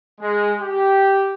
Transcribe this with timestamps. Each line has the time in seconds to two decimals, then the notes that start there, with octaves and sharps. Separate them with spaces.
0.21 G#3
0.60 G4